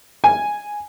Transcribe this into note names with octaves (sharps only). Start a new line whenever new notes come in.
G#5